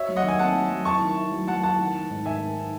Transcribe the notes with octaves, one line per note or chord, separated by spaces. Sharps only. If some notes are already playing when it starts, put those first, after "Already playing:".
Already playing: F#4 C#5 E5
F#3
D#5 F#5
D#3
G#5
C4 F#5 A5
F#3
F#3
E4 A5 C#6
D#3
E4
F#3
F#3 F#5 A5
E4 F#5 A5
D#3
D#3
G#2
D#3 E5 G#5
D#3
D#4